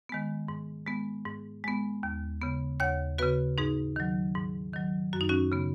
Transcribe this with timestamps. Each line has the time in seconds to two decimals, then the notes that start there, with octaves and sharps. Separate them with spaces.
0.09 D#3 G#3 B3
0.48 G#2
0.87 G#3 B3
1.26 G#2
1.64 G#3 B3
2.03 D#2
2.41 C#3 B3
2.80 D#2 C#5 F#5
3.18 C#3 B3 F#4 B4
3.58 G#2 D#4 G#4
3.96 D#3 F#3
4.35 G#2
4.73 D#3 F#3
5.13 F#2 F#4
5.21 D#4
5.29 C#4 F#4
5.52 C#3 B3